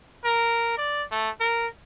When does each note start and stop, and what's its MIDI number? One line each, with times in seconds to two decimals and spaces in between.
0.25 0.73 70
0.77 1.03 74
1.11 1.30 57
1.40 1.67 70